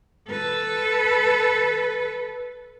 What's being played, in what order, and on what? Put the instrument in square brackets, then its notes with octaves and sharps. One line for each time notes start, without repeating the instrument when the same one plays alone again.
[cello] A4 B4